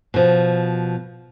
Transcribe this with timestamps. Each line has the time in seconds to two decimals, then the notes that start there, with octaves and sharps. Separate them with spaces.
0.14 B2 F3